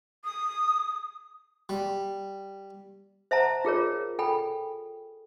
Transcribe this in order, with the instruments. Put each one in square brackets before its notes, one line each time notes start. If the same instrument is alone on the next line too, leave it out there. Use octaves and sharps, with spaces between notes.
[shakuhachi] D#6
[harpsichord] G3
[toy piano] C5 E5 F#5 A5 A#5
F4 G#4 A#4 C#5
A4 G5 G#5 B5